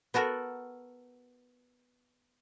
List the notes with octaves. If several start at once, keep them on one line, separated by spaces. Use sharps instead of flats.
B3 F#4 A4 A#4